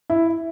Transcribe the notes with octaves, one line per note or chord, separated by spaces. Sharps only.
E4